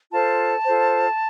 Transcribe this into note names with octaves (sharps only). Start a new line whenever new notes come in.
F4 A4 C5 A5
F4 A4 C5